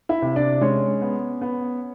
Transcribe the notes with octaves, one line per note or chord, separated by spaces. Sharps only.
E4 E5
C3
D4 D5
G#3 C#4 C#5
B3
B3